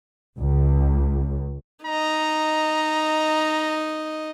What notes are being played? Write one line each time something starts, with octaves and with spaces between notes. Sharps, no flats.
C#2
D#4 D#5 A#5